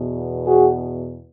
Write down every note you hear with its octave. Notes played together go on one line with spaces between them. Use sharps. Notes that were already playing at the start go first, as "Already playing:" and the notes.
Already playing: E2 B2
F#4 G#4